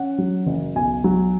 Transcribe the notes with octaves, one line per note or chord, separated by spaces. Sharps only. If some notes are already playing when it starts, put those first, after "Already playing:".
Already playing: C#4 F#5
F#3
F#1
B1 G#5
F#3